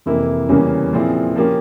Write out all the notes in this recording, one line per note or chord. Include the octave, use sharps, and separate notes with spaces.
F2 C3 E3 A#3 E4
E2 C#3 G3 A#3 C#4
A#2 F3 C4 E4 G#4
F3 A#3 C#4 G4